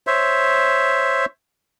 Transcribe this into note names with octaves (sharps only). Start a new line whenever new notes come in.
C5 C#5 E5